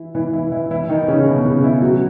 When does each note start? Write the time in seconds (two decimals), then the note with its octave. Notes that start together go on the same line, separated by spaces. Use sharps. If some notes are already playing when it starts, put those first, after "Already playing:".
Already playing: E3 E4
0.15 E3 E4
0.33 E3 E4
0.52 E3 E4
0.71 E3 E4
0.89 D#3 D#4
1.08 C#3 C#4
1.26 B2 B3
1.45 C#3 C#4
1.63 E3 E4
1.82 F#3 F#4